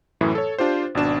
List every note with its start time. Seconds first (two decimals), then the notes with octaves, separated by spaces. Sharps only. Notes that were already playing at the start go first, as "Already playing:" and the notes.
0.21 F#2 A2 E3
0.35 A4 C#5
0.59 D4 F4 G4 C5
0.95 G#1 B2 D4 E7